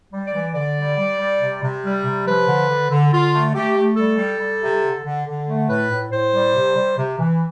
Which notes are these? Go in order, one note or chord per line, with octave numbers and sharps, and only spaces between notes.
G3
D5
E3
D3 D5
G3
G3
G3
C3
C3
G3
C3
F3 B4
D3
D3
D3
D3 F4
A3
A3 G4
A3
G3 A4
G3
G3
C3
D3
D3
D3
A3
A2 B4
A2
A2 C5
G3
C3
G3
C3
E3